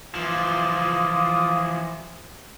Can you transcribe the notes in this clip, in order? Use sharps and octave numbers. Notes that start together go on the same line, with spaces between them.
E3 F3 F4 D6 D#6